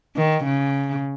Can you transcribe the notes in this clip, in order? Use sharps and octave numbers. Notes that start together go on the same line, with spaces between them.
D#3
C#3